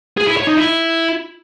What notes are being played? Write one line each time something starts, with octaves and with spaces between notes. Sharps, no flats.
G#4
E4
C#5
D#4
E4